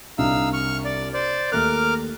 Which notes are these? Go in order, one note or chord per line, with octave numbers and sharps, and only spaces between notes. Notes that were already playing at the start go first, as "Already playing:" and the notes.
C2 D4 D#4 F5 E6
C#6 F6
D5
C5 D5
D#2 A3 A#4 D6 F6 F#6